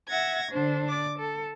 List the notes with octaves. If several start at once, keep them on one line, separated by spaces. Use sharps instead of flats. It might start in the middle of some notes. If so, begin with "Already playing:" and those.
E5 F#5 G#6 A#6
D3 D4 C5
D5 D6
A4